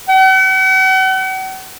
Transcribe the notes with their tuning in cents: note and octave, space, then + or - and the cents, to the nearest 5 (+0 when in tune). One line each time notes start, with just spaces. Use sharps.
F#5 +40